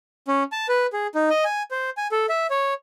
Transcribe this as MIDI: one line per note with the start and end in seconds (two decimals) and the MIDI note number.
0.28 0.43 61
0.52 0.67 81
0.69 0.86 71
0.93 1.07 68
1.15 1.29 63
1.30 1.44 75
1.45 1.63 80
1.71 1.90 72
1.97 2.07 80
2.12 2.26 69
2.29 2.47 76
2.50 2.74 73